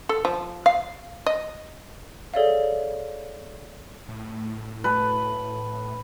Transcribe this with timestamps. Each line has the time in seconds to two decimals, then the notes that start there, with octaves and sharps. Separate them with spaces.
0.09 A4
0.25 F3
0.66 F5
1.26 D#5
2.34 G#4 A4 C#5 D5 E5 F5
4.09 A2
4.84 B4 A5